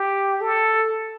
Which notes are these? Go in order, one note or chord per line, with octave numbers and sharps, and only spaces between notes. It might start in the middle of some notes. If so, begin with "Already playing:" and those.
Already playing: G4
A4